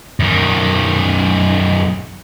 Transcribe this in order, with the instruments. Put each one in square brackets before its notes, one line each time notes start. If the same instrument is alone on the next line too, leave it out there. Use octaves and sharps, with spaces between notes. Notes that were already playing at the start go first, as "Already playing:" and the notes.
[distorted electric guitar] F#2 D#3